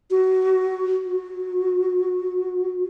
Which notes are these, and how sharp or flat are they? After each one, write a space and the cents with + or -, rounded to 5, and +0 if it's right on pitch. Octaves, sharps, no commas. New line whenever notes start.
F#4 +20
F#4 -15